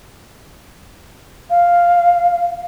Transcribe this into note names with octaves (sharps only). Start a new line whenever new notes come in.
F5